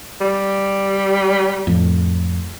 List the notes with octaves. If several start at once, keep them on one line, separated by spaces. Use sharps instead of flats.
G3
F2 A2